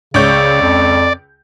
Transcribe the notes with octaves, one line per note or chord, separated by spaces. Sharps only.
C#2 C#3 C#5 D5 G6
F2